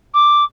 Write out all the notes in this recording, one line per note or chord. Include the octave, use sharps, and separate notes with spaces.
D6